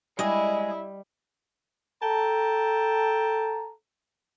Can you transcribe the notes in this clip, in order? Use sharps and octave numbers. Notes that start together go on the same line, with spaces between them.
G3 G#3 E4 G#4 D#5
A4 G5 A5 A#5